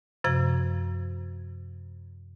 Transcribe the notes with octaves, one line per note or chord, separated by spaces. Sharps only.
F#2 C3 F3 G#6